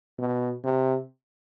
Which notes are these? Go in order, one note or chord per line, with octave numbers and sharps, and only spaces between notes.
B2
C3